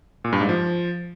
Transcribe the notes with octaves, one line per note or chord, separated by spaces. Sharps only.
A#2
G2
G#2
F3